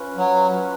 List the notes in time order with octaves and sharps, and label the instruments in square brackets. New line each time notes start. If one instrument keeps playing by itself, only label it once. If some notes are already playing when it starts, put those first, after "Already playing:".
Already playing: [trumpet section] C#4 F4 B4
[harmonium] F#3